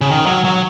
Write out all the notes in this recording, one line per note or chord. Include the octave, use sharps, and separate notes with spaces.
C#3
D#3
F#3
F#3